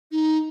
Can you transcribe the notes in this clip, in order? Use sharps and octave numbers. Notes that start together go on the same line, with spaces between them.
D#4